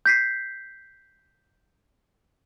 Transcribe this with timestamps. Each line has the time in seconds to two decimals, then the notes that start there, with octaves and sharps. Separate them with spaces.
0.06 G6 B6 C7